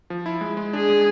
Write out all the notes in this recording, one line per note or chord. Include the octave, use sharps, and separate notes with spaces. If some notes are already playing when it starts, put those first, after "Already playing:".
F3
E4
G#3
G#3
D4 G#4
G#3